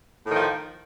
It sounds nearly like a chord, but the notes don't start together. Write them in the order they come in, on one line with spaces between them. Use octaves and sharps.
A2 D#3 F3